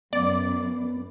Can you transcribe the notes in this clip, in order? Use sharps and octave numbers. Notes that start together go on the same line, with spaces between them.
F#2 B3 D5